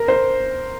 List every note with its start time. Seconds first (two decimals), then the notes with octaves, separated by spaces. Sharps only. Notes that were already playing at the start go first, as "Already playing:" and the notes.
Already playing: A#4
0.08 C5